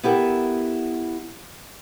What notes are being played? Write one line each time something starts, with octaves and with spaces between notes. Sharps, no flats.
B3 E4 G4 A4 A#4